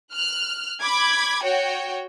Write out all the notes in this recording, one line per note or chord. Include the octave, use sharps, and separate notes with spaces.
F6 F#6
B5 D6 G#6
F#4 C#5 G5